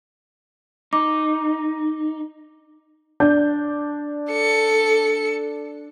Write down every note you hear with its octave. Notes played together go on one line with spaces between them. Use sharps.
D#4 D6
D4 G6
A4 C#7